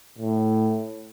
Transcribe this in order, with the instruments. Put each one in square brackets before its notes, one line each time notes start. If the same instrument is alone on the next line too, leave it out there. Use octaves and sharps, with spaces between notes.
[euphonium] A2